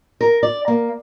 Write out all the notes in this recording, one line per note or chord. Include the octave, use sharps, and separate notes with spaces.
A#4
D5
A#3